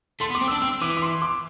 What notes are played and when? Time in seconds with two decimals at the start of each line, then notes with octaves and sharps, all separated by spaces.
0.20 A3 C6
0.30 B3
0.35 D6
0.41 C4
0.47 D4 E6
0.61 C4 E6
0.82 E3 D6
0.97 D6
1.02 C6
1.22 D6